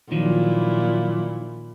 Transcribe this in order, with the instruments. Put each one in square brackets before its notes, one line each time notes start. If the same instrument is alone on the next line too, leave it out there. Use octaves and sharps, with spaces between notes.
[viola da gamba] A#2 E4 [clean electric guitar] D#3 F3 F#3